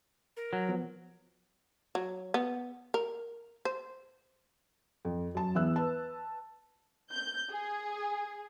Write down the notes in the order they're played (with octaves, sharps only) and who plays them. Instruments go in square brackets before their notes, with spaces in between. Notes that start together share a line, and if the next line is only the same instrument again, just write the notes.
[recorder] A#4
[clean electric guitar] F#3
[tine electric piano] F3 B3
[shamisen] F#3
B3
A#4
C5
[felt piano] F2
F#2 A5
E2 E3 B3 E5 E6 F#6
B4 A5
[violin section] G6
G#4